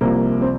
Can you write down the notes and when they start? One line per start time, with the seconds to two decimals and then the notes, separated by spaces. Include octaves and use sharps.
0.01 C2 C3 F3 A#3
0.41 C4